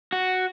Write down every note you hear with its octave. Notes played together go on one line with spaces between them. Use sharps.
F#4